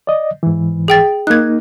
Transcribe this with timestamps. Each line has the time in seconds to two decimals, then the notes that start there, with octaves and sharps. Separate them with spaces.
0.07 D5 D#5
0.43 G#2 E3
0.88 G#4 G5 A6
1.27 A#3 D#4 F#6 G#6